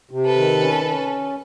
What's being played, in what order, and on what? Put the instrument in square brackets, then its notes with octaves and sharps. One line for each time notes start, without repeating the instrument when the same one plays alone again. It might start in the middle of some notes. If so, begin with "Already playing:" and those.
[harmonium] C3
[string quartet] A4 B4
[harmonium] D#3
C#4
C#4